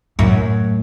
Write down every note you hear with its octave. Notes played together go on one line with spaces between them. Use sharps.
F#2 A2